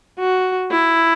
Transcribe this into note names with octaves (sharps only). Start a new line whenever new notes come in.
F#4
E4